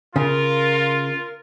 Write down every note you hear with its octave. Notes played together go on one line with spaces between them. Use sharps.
C#3 F4 A#4